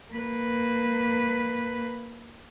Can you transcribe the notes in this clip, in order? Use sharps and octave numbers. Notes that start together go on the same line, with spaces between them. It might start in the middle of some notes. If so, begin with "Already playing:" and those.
A#3 B4